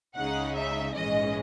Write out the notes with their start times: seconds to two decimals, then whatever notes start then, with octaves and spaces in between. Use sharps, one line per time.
0.15 C#2 C#3 G#3 D#4 F#5
0.55 E5
0.95 A#1 G#2 E3 G#3 C#4 D#5